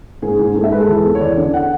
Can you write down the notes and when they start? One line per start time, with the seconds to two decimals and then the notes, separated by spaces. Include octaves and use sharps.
0.22 G#2 G#4
0.39 G#2
0.55 G#2 A4
0.64 E5
0.72 G#3 B4
0.80 A4
0.88 E2
1.05 B3
1.15 C#5
1.21 E2 D5
1.37 D3
1.54 F#5